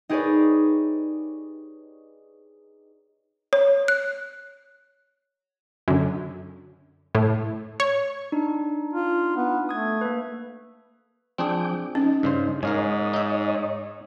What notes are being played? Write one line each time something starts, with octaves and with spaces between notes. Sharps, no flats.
D#4 G4 G#4 B4 C#5 D5
C#5
F#6
F#2 D3
A2
C#5
D4 D#4
F4
B3
A3 D#6 G#6
A#3 B4
F3 C4 D4 G#4 G5 D6
C#4 D#4
G2 C#3 C5
G#2 A#4 C#5 D#5 F5 G#5
D#4 E5